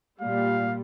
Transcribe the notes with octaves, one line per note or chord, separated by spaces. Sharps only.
A#2 G3 F5